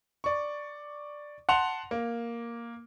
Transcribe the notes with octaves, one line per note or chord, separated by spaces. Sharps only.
D5 C#6
F#5 A5 C6 F7
A#3